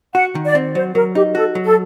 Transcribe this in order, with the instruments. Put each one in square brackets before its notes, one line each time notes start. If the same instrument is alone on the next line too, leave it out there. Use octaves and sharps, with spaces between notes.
[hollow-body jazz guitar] F#4 [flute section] F#5
[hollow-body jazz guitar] D#3
[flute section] D5
[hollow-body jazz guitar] C4
[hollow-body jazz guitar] F#3 [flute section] C5
[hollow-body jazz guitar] F#3 [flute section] A#4
[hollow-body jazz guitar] D#4 [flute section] G4
[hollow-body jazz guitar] F#4 [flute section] A4
[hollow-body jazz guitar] F#3
[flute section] A4